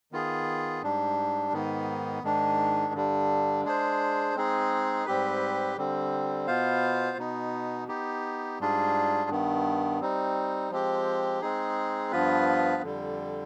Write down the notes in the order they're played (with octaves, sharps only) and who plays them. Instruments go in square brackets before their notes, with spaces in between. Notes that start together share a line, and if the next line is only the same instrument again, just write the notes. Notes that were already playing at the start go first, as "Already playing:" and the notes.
[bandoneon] D#3 B3 F4 G#4
G#2 G3 D4
G#2 D#3 B3
G#2 D#3 G#3 D4
G2 D3 G3 D4
G#3 D4 G#4 C5
G#3 C4 D#4 G#4
G#2 G3 C4 G4 B4
D3 G3 C4
B2 B3 F4 C5 F5
B2 B3 D#4
B3 D#4 G4
G#2 G3 D4 F4 G#4
G2 D#3 B3
G3 C4 D#4
F3 G#3 C4 G4
G#3 C4 D#4 G#4
G2 F3 B3 F4 B4
F2 D3 G3